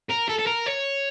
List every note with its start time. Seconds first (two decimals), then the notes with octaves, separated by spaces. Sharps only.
0.09 A#4
0.29 A4
0.39 A4
0.47 A#4
0.66 C#5